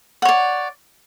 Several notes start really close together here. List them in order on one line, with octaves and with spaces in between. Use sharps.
F#5 C#5 D5